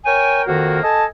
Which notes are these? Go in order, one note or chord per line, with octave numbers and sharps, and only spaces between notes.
A#4 C#5 G5 G#5
F2 D#3 A#3 F#4
A4 D#5 G#5 A5